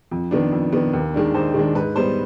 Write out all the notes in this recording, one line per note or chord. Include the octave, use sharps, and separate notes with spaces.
F2
D#3 B3 D4
F2
D#3 B3 D4
D#2
D#3 G#3 D4
D#2 C5
D#3 G#3 D4
G#2 B4
G3 B3 C5